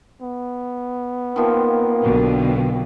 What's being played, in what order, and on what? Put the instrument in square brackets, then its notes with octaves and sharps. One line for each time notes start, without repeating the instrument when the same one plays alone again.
[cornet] B3
[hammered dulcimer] D#3 F3 C4 [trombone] A#3
[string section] B1 B2 D3